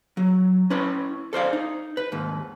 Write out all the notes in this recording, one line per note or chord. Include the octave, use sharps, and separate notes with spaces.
F#3
C#4 E4 B4 B5
A4 C5 D5 F5
D#4
B4
D#2 G#2